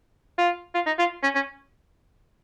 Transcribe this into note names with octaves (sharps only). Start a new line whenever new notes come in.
F4
F4
D#4
F4
C#4
C#4